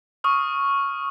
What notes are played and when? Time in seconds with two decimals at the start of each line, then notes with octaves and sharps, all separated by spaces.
0.24 C#6 D#6 F6